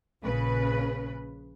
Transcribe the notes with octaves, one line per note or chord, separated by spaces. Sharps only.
A#1 C#3 B4